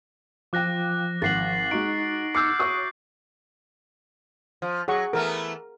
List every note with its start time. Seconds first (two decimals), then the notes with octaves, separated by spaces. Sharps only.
0.53 F3 F4 G5 D6 F#6 A#6
1.22 G#1 F#5 A6 C7 F#7
1.71 G#3 D#4 F#4 C#6 B6 D7
2.34 D6 E6 F6 G6 C7 C#7
2.59 F#4 C#5 E5 D#6
4.62 F3
4.88 F#3 G#4 F#5 C#6
5.13 E3 A3 B3 A#4